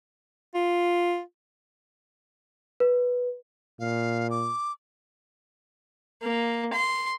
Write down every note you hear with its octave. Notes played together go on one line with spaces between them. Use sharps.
F4
B4
A#2 F5
D6
A#3
C6